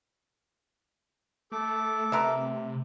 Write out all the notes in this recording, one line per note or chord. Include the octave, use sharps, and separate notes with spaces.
A3 A4 D6
C3 A3 B3 A#4 E5